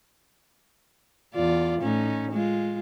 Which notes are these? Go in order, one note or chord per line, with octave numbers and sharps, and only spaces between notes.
E2 F4 D5
A2 C#4 D#4
G#3 F4